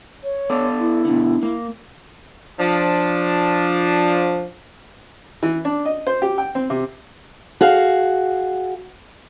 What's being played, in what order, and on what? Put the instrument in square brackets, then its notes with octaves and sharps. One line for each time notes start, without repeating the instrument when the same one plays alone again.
[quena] C#5
[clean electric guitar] B3 A4 D5
[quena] E4
[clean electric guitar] B2 D3
A#3
[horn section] F3 D4
[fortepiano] E3
D4
D#5
C5
G4
G5
C4
C3
[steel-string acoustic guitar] F#4 G#4 F5